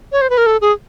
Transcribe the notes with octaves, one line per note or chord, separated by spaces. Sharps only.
C#5
C5
B4
A#4
A4
G#4